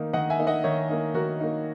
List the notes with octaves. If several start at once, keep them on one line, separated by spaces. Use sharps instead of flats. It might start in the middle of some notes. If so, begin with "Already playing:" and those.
Already playing: D#3 A#3 D#4
D#3 D#5 F#5
E5 G#5
A#3 D#4
D#5 F#5
D#3 C#5 E5
A#3 D#4
D#3 F#4 A#4
A#3 D#4